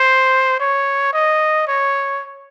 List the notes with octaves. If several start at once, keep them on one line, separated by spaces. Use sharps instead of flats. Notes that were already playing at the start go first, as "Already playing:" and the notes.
Already playing: C5
C#5
D#5
C#5